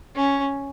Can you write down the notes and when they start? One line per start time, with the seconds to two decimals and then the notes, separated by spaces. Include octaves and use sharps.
0.15 C#4